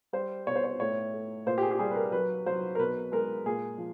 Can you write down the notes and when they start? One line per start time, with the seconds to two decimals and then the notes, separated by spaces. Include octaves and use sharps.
0.13 G3 C5
0.47 B2 C#5
0.55 C5
0.64 C#5
0.80 A2 C#5
1.14 A3
1.46 A#2 C5
1.58 G4
1.62 G#4
1.71 G4
1.79 G3 G#4
1.91 B4
1.95 A#4
2.12 F#3 B4
2.46 F#3 C5
2.75 A#4
2.79 B2 B4
3.12 G#3 A#4
3.46 A#2 G#4
3.78 F3